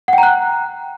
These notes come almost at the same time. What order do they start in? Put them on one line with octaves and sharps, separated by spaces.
F#5 G5 A#5 F#6